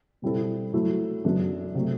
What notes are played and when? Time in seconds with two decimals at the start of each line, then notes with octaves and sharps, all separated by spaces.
0.22 B2 G3 C4 E4 A4
0.73 F#3 A3 E4 A4
1.24 F#2 D3 F#3 B3 D4
1.75 C3 F#3 A3